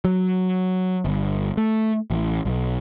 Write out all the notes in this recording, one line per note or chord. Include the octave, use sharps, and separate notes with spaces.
F#3
G1
A3
A1
B1